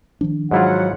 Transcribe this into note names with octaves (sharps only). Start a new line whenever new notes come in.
D#3 F3 D4
G#2 F#3 E4 F4 F#5